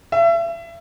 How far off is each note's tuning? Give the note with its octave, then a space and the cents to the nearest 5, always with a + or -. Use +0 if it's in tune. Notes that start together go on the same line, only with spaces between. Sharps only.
E5 +35